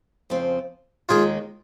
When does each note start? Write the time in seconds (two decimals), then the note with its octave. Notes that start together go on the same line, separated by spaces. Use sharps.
0.30 F2 C#3 F3 C4
1.09 D#2 D#3 G#3 F4 G#4